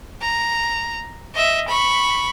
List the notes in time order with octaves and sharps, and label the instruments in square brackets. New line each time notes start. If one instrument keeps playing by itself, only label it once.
[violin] A#5
D#5 E5
B5 C#6